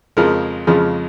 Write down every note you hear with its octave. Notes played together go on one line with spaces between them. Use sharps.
F2 C#3 F3 G#3 A#4
F2 C#3 F3 G#3